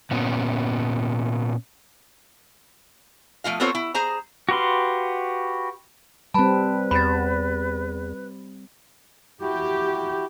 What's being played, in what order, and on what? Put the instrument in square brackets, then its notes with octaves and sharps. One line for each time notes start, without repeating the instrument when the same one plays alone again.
[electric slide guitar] A#2 B3 C#4
[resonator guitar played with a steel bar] F3 A3 F4 F5
B3 C4 F4 A4 C5 C#5
E4
G#4 C5 A#5
[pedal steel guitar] F#4 G4 B4 F5 C6
[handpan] G3 C4 [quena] B4 [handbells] A5 B5
[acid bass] E2 [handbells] B5 A6
[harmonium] E4 F#4 [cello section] G4